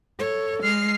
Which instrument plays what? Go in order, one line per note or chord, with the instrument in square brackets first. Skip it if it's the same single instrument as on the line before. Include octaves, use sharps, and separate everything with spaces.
[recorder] A4 [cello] C#5
[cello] G#3 [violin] F6 C7